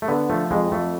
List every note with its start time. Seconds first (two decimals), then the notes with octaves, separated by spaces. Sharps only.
0.02 A3
0.08 D3 B3
0.30 F3 A3
0.51 F2 G#3
0.72 F2 A3